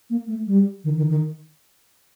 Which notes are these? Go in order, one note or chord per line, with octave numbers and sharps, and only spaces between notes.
A#3
A3
G3
D#3
D#3
D#3